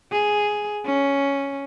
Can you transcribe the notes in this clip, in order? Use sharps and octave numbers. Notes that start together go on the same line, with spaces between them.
G#4
C#4